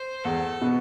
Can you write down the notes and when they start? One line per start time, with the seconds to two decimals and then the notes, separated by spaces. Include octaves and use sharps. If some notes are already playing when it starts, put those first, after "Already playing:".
Already playing: C5
0.24 E2 A4
0.61 B2 B3